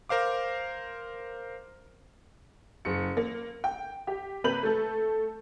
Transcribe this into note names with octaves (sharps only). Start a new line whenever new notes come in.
A#4 C5 F5 D6
F#1 C#7
A#3
G5
G4
C3 A#3 B4 G6 F#7
A3 A4